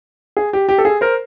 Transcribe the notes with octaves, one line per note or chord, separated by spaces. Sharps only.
G#4
G4
G4
A4
G#4
A#4 C5